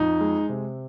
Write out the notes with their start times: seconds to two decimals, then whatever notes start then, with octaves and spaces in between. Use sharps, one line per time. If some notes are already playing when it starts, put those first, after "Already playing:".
Already playing: F2 D#4
0.21 G#3
0.49 C3